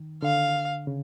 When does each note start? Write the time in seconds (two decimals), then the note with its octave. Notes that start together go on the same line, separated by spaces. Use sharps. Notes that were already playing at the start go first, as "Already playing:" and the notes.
Already playing: D#3
0.22 D3 F5
0.87 C#3